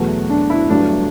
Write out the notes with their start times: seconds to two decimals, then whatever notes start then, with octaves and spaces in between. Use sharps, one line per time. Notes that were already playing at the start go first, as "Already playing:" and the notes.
Already playing: E2 B2 F#3 A3 F#4
0.30 D4
0.50 E4
0.69 G1 G2 F#3 A3 D4